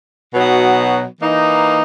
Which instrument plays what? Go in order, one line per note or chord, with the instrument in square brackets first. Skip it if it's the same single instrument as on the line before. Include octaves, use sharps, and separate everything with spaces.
[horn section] B2 F#3 B3 D#4 F#4
E3 A#3 D#4